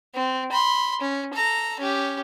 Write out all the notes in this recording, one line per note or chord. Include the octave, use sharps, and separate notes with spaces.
C4
B5 C6
C#4
A4 A#5
C#4 G4